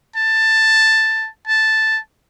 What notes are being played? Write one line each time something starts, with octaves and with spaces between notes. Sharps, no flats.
A5
A5